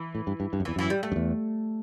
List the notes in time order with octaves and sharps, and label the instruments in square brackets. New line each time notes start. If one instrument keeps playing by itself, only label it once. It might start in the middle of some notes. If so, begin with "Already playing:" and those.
Already playing: [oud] E3
[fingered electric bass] A2
G2
G2
G2
F#2
[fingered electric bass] E2 [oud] E3
[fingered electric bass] F#2 [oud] E3
[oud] G3
A3
[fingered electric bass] F#2
E2